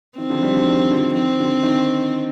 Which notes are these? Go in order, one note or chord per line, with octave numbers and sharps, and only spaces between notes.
D#3 C4
D3 F3
D#3 G3
D3 F3
D#3 G3
D3 F3
D#3 C4
D3
D#3